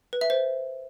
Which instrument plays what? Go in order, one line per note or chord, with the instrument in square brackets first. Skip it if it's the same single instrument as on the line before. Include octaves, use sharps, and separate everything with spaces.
[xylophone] B4
E5
C5